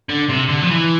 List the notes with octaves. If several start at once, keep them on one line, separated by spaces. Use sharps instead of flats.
D3
C3
D3
F3
E3